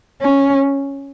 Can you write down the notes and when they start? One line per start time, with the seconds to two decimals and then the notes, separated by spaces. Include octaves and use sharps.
0.22 C#4